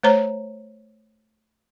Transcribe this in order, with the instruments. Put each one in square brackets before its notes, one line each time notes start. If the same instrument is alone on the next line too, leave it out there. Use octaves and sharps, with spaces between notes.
[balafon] A3 C5 C#5 A#5